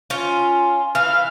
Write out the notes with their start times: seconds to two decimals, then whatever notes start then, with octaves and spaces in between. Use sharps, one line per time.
0.10 C#4 F4
0.95 E3 F5